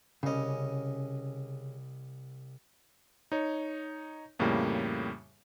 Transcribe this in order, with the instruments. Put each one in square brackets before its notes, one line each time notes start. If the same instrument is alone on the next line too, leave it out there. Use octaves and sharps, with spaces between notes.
[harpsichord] C2 D#5 [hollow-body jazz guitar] C#3 C#4
[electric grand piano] D#4 C#5
F2 A2 C#3 G3 A#3